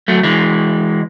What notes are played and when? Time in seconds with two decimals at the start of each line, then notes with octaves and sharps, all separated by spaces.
0.08 F#3 A3
0.23 E3 G#3